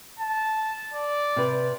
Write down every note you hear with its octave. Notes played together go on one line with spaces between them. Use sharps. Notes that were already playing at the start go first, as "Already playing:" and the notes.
A5
D5
C3 B4